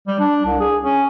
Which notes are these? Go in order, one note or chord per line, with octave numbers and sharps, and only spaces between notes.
G3
D4
C2
G#4
C#4